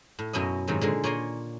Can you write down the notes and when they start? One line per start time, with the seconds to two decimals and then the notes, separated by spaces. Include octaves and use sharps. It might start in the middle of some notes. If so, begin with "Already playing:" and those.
0.19 A2
0.33 F#2 B2 C#4 E4 D#5
0.68 G#2 C3 D#3 F#3
0.81 A#2 D3 G#3
1.04 A#2 C#5 D5 G#5 A#5 C6